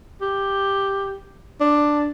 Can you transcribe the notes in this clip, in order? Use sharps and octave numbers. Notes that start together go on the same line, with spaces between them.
G4
D4